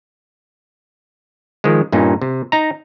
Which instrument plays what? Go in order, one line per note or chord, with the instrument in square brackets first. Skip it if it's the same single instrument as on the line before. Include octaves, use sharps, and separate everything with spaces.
[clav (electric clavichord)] D#3 F3 G#3
G2 A#2 C#4 D#4
C3
D#4 A#5